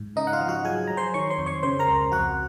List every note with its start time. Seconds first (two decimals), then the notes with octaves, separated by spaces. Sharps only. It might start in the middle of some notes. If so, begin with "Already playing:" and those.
Already playing: G#2
0.16 C#3 D#4 D#5
0.27 F#5
0.33 F4 F5
0.41 F3
0.48 F#4 F#5
0.65 F#3 G#4 G#5
0.87 F#3 A#5
0.97 C5 C6
1.14 D#3 C#5 C#6
1.30 C5 C6
1.38 F2
1.46 C#5 C#6
1.63 C#3 C5 C6
1.79 A#4 A#5
1.88 C#2
2.12 F2 F#4 F#5